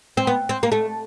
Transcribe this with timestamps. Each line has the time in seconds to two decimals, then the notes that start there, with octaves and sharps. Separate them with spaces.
0.17 C4
0.27 B3
0.49 C4
0.63 A#3
0.72 A3